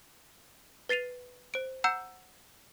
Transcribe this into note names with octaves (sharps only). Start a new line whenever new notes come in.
B4 A6 C7 D#7 F7
C5 D7
F#5 A#5 E6 G6 C#7 E7